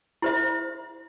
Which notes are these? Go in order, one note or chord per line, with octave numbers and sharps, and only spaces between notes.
E4 C5 E5